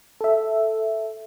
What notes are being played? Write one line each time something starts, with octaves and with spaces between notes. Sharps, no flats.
A4 E5